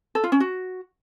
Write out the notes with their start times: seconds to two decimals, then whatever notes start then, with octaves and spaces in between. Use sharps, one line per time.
0.15 A4
0.24 F4
0.32 C#4
0.40 F#4